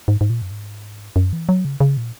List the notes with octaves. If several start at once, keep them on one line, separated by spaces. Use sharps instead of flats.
G#2
G#2
A#2
F#2
G#2
F#2
E3
F#3
C#3
C#3
A#2